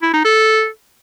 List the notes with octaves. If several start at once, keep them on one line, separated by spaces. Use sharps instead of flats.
E4
D#4
A4